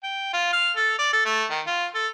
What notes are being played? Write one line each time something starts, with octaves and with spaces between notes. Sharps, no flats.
G5
F4
F5
A4
D5
A4
A3
D#3
F4
A4